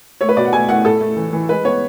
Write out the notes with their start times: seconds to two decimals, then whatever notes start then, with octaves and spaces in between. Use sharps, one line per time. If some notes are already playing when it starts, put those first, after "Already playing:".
0.21 A3 C#5
0.29 B4
0.37 B2 D5
0.45 F#5
0.53 A3 G#5
0.69 A3 F#5
0.85 A2 A4
1.01 A3
1.16 E3
1.33 E3
1.49 G#3 B4
1.65 B3 C#5